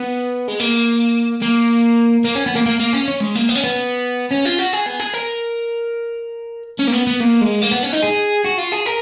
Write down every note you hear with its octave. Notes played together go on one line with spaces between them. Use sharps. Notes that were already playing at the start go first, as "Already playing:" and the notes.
Already playing: B3
G#3
A#3
A#3
A#3
C#4
B3
A#3
A#3
A#3
C#4
C#4
G#3
A#3
B3
C#4
B3
C#4
F4
F#4
G#4
B3
G#4
A#4
C#4
A#3
B3
B3
A#3
G#3
A#3
B3
C#4
D#4
G#4
F#4
F4
G#4
A#4